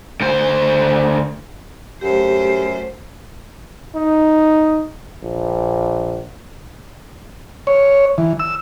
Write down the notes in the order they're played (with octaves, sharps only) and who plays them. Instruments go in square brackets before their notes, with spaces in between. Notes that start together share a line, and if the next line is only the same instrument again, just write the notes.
[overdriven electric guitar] D2 C5
[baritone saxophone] F#2 [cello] A3 C5 [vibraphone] G4
[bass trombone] D#4
A#1
[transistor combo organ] C#5
E3
E6